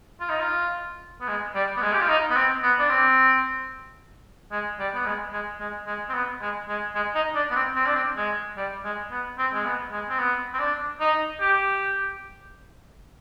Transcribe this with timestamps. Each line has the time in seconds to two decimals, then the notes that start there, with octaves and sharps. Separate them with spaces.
0.20 F4
0.29 D#4
0.40 F4
1.21 B3
1.28 G#3
1.55 G3
1.77 B3
1.82 G#3
1.93 G4
2.01 F4
2.09 D#4
2.30 B3
2.36 C4
2.63 B3
2.79 D4
2.90 C4
4.51 G#3
4.79 G3
4.94 B3
5.06 G#3
5.33 G#3
5.60 G#3
5.87 G#3
6.09 C4
6.14 B3
6.41 G#3
6.68 G#3
6.95 G#3
7.15 D#4
7.35 D4
7.50 B3
7.55 C4
7.76 C4
7.86 D4
7.95 C4
8.16 G#3
8.57 G3
8.84 G#3
9.11 B3
9.38 C4
9.53 G#3
9.65 B3
9.92 G#3
10.09 C4
10.19 B3
10.53 C4
10.59 D4
11.00 D#4
11.40 G4